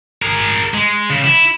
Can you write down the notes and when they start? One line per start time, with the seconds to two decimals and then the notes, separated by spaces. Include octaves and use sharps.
0.22 G#4 A#4
0.74 G#3
1.10 C#3
1.25 E4